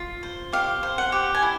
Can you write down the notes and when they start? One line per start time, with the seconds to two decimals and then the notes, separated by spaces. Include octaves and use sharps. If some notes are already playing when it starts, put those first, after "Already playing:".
Already playing: F4
0.23 C5
0.53 G4 F5
0.83 C5
0.98 F#5
1.12 G4
1.34 G#5
1.42 E4